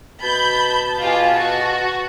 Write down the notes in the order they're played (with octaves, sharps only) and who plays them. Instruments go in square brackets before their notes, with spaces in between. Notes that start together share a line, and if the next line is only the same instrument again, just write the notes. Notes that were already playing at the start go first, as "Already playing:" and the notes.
[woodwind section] B2 A5 [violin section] B5 G6
[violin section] F4 G4 G#4
F#4